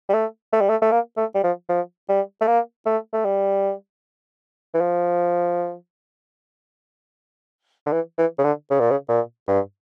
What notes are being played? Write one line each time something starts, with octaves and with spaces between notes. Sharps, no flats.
G3
A3
A3
G3
A3
A3
A#3
A3
G3
F3
F3
G3
A3
A#3
A3
A3
G3
E3
F3
D3
E3
E3
C#3
D3
C#3
A#2
C#3
A#2
G2